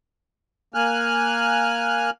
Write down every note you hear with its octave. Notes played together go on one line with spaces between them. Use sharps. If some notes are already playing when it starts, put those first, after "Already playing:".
A#3 G#5 F6 F#6